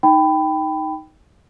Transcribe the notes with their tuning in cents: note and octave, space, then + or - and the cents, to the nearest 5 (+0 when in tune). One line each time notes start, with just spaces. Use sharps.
D#4 +0 G5 +0 B5 +15